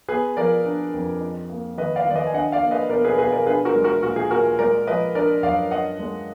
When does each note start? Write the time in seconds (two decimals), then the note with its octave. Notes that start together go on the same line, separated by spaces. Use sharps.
0.08 B3 G#4 B4
0.37 F3 A#4 D5
0.65 D4
0.93 F2
1.21 D#4
1.50 A#3
1.77 D#3 B4 D#5
1.96 D5 F5
2.05 D#3
2.10 D5
2.15 B4 D#5
2.27 G#5
2.34 D4 D#5 F#5
2.52 D5 F5
2.62 A#3
2.71 B4 D#5
2.90 B2 A#4 D5
3.05 G#4 B4
3.18 B2 G#4 B4
3.32 A#4 D5
3.46 D4 G#4 B4
3.65 F#4 A#4
3.75 G#3
3.84 F#4 A#4
4.03 A#2 F#4
4.16 G#4
4.31 A#2 F#4 A#4
4.59 G#3 A#4 D5
4.87 F3 B4 D#5
5.15 D4 A#4 D5
5.43 F#2 D5 F5
5.71 D#4 D#5 F#5
5.99 G#3